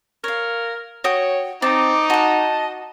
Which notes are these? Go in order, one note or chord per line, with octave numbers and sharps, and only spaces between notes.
A#4 C#5 F5
F#4 C#5 G5 D#6
C4 D#4 A5 D6
F#4 D#5 F#5 A5